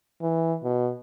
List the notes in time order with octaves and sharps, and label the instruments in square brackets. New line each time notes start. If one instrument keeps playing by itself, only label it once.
[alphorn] E3
B2